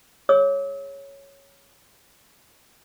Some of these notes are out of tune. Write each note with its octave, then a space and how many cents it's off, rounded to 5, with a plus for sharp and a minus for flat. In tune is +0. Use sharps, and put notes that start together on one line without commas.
G#4 +0 C#5 +0 E6 -40